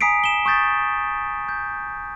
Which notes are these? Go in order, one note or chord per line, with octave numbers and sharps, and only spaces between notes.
G#5 A#5 D#6 B6 C7 D7
E7 G7
C#6 D#6 G6 A6 B6
G6